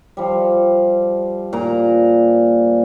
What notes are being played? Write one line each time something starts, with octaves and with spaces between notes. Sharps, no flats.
F3 G3
A#2 A#5